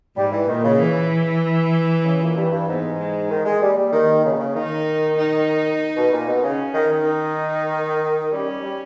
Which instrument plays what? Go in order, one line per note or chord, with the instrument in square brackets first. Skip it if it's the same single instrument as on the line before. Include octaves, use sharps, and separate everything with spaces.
[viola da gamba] G#2 [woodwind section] G3
[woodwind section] E3
[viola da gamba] A#2 [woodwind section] D#3
[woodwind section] C#3
[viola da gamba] E3
[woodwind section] C#3
A#2
G2
G2
[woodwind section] G#2 [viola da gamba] B3
[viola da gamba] G#3
[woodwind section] D#3
G#3
[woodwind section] G3 [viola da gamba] A#3
[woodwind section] G3
D#3
C#3
B2
C#3
[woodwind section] D#3 [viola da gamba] D#4
[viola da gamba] D#4
[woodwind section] B2
A#2
B2
[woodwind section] C#3 [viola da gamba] C#4
[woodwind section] D#3
D#3
[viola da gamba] D#4
[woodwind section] G3 [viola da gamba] C#4
[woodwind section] G3
G3